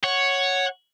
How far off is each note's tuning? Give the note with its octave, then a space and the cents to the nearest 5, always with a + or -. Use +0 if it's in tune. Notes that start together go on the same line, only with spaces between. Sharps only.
C#5 +0 F#5 +0